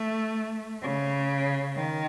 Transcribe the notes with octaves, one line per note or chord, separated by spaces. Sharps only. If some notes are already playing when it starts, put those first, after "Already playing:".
Already playing: A3
C#3
D#3